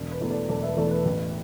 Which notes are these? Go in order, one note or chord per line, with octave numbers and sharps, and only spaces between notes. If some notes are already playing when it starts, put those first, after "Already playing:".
Already playing: E1
B4
E2 E3 A3
A4 D5
E1 A4 D5
B4 E5
E2 E3 A3 A4 D5
B4
A1